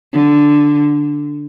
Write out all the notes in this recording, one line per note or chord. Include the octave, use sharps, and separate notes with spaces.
D3